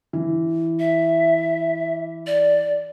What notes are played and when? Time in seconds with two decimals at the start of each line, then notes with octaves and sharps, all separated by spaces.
0.13 E3
0.79 E5
2.27 D5